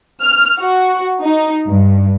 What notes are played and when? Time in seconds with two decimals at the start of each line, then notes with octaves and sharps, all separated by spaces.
0.23 F6
0.59 F#4
1.24 D#4
1.66 G2